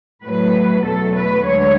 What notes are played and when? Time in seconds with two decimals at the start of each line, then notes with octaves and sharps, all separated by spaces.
0.24 A2 F#3 A3 B4
0.85 E2 B2 F#3 A3 A4
1.14 B4
1.44 D2 D3 G#3 C#5